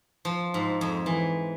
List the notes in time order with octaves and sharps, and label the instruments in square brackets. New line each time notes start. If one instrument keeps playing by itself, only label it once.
[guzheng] F3
G#2
F2
E3